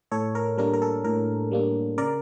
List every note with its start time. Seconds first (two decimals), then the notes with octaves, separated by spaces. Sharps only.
0.12 A2 A4 C#5
0.35 A#4
0.58 G3 A#3 D4 A#4
0.73 A#4
0.82 A4
1.04 A2 A#4
1.51 G3 A#3 D4
1.98 C#3 A#4 D5